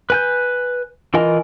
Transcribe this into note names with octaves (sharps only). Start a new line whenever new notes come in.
B4 G#5 G6
E3 F4 A#4 D#5 G#5